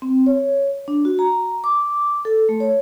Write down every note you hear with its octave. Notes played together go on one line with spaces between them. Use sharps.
C4
C#5
D4
F#4
A#5
D6
A4
A3
C#5